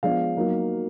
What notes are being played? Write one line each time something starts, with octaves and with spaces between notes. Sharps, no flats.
F3 G#3 B3 D4 F5
F#3 A#3 D#4